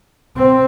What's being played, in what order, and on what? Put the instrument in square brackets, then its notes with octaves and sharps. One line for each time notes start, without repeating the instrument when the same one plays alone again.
[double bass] C4